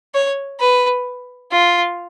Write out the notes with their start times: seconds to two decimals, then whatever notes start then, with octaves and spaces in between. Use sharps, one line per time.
0.15 C#5
0.60 B4
1.52 F4